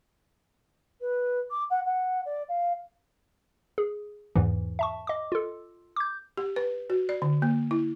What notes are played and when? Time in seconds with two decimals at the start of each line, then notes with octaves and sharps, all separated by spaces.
1.01 B4
1.50 D6
1.70 F#5
1.85 F#5
2.25 D5
2.48 F5
3.78 G#4
4.36 E2 G#2 E3
4.79 E5 A5 C#6
5.07 D#5 D6
5.32 F4 A4
5.96 D6 G6
6.37 G4
6.56 B4
6.90 F#4
7.09 D5
7.22 D3
7.42 A#3
7.71 E4